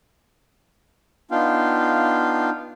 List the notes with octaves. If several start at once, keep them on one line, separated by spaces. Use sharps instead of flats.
B3 D4 D#4 F4 F5 G5